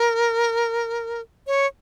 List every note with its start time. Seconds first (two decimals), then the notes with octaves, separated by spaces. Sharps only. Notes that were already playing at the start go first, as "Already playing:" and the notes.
Already playing: A#4
1.47 C#5